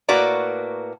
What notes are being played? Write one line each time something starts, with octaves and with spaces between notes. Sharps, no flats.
A2 A#3 F#4 B4 D5 A#5